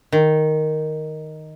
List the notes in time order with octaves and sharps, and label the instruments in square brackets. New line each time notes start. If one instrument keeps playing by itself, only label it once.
[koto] D#3